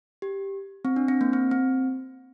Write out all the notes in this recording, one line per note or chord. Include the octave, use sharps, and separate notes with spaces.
G4
C4
D4
C4
A#3
C4
C4